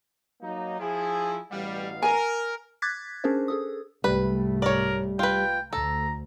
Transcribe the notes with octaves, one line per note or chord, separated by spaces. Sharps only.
F#3 A#3 D#4
F3 E4 G#4
A1 B2 G3 F5
A#4 G#5
D6 F#6 G#6 A6 B6
C#4 D4 G#4 A#4 C5
G#4 A4 D#6
C2 G#2 G3 A3 B4
A#4 C#5 D5
F4 B4 G5
D2 A4 A#5